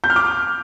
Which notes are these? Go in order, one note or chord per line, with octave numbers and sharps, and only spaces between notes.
G6
F6
D6